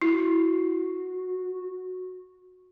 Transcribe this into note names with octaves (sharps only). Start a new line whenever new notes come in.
E4 F#4